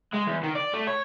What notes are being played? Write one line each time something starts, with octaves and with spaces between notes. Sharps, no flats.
G#3
E2
D#3
D5
A3
C#5